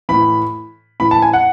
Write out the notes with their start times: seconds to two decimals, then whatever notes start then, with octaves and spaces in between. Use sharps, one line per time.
0.09 A2 E3 B5
1.00 A2 E3 B5
1.11 A5
1.22 G#5
1.33 F#5